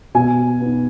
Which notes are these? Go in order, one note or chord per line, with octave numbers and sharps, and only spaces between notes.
B2 G#5
B3 D#4